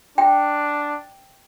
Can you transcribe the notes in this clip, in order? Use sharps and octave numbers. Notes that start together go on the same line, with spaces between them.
D4 G5